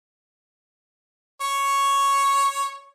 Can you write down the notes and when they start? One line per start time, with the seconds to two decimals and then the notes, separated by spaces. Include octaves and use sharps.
1.41 C#5 C#6